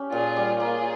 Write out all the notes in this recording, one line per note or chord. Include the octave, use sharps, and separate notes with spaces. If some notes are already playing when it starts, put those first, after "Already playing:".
Already playing: C#4 G4
A#2 F4 G#4
G3
A#3 F4 G#4